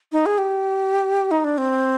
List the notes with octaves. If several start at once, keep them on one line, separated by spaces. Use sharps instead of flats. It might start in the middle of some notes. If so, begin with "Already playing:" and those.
D#4
G#4
G4
D#4
D4
C4